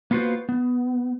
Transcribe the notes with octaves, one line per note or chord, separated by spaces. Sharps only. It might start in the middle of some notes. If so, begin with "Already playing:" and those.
A#3 B3 F4 F#4 B4 C5
B3